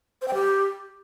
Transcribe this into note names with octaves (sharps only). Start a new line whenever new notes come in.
C5
G5
G4